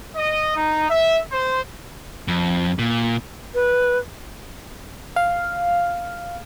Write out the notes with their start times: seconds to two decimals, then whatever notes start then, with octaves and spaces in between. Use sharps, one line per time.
0.16 D#5
0.55 D#4
0.89 E5
1.30 C5
2.28 F2
2.79 A#2
3.54 B4
5.16 F5